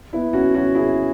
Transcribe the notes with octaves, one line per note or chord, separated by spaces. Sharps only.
B3 E4
C#4 F#4
C#4 F#4
E4 G#4